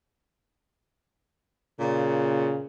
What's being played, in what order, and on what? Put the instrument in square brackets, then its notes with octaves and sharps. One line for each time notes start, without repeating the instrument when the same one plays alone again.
[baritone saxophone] A#2 [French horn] C#3